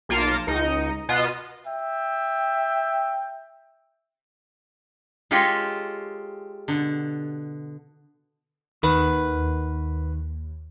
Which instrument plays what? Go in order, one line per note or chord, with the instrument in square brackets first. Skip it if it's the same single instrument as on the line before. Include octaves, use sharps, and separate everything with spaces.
[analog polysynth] B1 A#3 F4 A#4 A5 C#7
C#2 D#4 D#5 C#7
B2 B3 F4 D#5 A#6
[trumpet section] E5 G5
[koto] G#3 F4 G4 A4 C#5 D#5
B2 D3
[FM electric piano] D#2 [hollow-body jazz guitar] D#3 [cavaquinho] B4 F#5